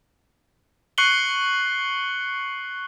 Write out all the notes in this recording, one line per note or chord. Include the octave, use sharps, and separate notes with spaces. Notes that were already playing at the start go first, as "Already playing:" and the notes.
C#6 F#6 C7 C#7 F#7 G7